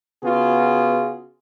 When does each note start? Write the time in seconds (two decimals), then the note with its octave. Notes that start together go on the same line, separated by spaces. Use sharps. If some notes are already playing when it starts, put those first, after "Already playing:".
0.23 C#3 B3 F4 F#4 G#4